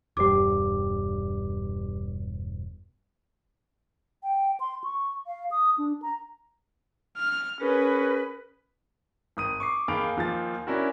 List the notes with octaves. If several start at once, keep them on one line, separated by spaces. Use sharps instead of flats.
E1 G2 G3 G4 D6
G5
C6
C#6
F5
D#6
D4
A#5
F6
C#4 G#4 A#4 B4
G#1 D#6 D#7
C#6 D6 C7
D#2 G#4 F5 B5 D7 F7
D#2 F3 G#5 A6
C#4 D4 E4 F#4 A#4